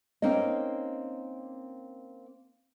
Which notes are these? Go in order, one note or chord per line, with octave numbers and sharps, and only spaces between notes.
A#3 C4 C#4 D#4 D#5